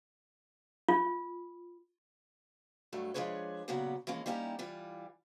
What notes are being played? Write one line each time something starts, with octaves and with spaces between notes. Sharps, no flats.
F4
G2 F#3 G3 A3
F3 G#3 D4 G#4 B4 C#5
A#2 C#3 F#3 B3 F#4 G4
E3 F3 G#3 A#3 C#4
G3 A#3 C#4 D#4 E4 G4
E3 G3 F4